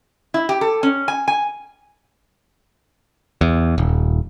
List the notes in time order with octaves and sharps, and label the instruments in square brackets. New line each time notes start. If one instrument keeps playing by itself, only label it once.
[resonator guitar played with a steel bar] E4
G4
A4
C#4
G#5
G#5
[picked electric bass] E2
D#1